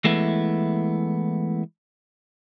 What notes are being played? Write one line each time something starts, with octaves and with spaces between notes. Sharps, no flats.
E3 G#3 A3 B3 E4